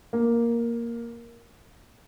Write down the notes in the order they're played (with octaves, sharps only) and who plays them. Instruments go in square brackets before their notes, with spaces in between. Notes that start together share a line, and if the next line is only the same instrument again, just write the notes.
[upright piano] A#3